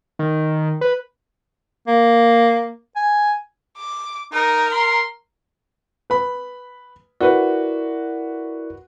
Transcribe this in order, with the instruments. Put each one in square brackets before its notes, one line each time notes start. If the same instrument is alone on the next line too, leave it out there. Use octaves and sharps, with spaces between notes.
[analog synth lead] D#3
B4
[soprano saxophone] A#3
G#5
[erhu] D6
[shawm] D#4 [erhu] A#4
[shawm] C6
[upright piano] B4 B5
[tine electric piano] E4 A#4 D5 [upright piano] F#4 B4